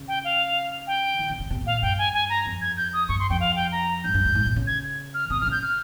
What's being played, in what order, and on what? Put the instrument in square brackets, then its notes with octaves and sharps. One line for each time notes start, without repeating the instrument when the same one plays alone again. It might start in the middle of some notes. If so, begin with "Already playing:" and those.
Already playing: [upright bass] C#3
[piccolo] G5
F5
G5
[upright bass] D#3
C#3
C#3
C3
A#2
[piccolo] F5
[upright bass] G2 [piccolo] G5
[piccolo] G#5
G#5
A#5
[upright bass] F2
[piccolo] G#6
G6
D#6
[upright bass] G2 [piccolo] C#6
[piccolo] C6
[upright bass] F2 [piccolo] G5
[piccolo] F5
G5
A#5
[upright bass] G2 [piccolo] G6
[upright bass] G2
G2
G#2
A#2
C#3
[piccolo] G#6
F6
[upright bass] C3 [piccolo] D#6
[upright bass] D#3 [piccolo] F6
[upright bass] C#3
[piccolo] G6
F6